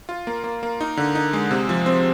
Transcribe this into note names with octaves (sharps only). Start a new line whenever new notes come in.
F4
A#3
A#3
A#3
D#4
D3
D#4
G#3
C3
F3
C4